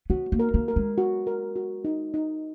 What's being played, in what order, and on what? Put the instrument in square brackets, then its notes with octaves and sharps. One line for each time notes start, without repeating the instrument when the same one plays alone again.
[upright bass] B3 [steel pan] F#4
[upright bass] A#3
[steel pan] A#4
[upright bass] A#3
[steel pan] A#4
[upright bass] G#3
[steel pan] F#4
A#4
F#4
D#4
D#4